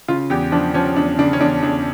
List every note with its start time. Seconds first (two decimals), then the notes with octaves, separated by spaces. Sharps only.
0.08 C#3 F4
0.30 E2 G4
0.52 F3 D4
0.74 F3 C#4
0.96 E2 D4
1.18 C#3 D4
1.33 C#4
1.40 E2 D4
1.63 E2 D4